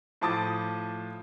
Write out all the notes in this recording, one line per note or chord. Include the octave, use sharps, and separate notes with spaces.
A2 F3 A5 D6 D#6 A6